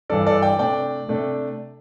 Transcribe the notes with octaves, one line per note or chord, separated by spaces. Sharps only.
G2 E3 G3 D4 A4 D5
A4 D5
D5 G5
C3 A3 D4 D5 G5
C3 A3 D4